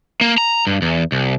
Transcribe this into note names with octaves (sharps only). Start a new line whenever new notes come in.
A#3
A#5
G2
E2
C2